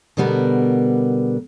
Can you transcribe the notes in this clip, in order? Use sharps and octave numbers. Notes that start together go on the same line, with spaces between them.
B2 D3 G3 B3 A#4 B4